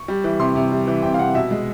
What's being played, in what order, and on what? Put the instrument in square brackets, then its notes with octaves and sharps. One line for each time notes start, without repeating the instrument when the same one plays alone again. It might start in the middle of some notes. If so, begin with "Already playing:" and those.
Already playing: [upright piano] C#6
G3
E3
C3 C6
C3
G3
E3
C3 G5
F5
C3 F#5
B2 E5
G#3